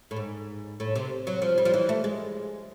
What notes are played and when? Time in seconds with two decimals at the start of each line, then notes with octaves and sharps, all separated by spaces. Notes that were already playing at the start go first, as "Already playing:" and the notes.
0.11 A2
0.16 G#2
0.80 A2
0.95 C3
1.27 F#3
1.42 F3
1.58 G3
1.65 F3
1.74 E3
1.89 A3
2.04 G#3